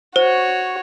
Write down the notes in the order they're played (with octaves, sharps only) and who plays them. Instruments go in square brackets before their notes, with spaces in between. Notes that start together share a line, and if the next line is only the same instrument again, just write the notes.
[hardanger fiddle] F#4 C#5 [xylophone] C5